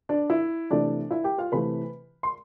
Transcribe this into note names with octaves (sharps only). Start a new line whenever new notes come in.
D4 D5
E4 E5
C3 E3 A3 D4 D5
E4 E5
G4 G5
F4 F5
C3 E3 A3 B4 B5
C6